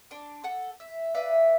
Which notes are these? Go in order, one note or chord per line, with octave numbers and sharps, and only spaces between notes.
D4 C6 D6
A4 F#5
E5
B4 D5 E5 F5